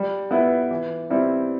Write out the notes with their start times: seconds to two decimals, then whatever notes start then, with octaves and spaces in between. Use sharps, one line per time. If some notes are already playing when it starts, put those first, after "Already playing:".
Already playing: G3
0.31 B3 E4 B4
0.71 E3
1.10 G3 C4 E4